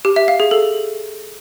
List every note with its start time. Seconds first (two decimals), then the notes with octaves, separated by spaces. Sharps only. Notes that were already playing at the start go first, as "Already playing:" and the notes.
0.05 G4
0.16 E5
0.28 F5
0.40 G#4
0.51 A4